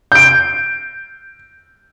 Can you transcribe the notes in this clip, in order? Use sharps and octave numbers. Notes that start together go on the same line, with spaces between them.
G6 D7